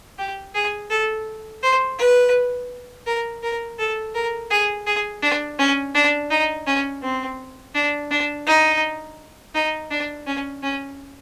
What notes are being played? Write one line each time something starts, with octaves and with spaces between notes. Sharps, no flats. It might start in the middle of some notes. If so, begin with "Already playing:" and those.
G4
G#4
A4
C5
B4
A#4
A#4
A4
A#4
G#4
G#4
D4
C#4
D4
D#4
C#4
C4
D4
D4
D#4
D#4
D4
C#4
C#4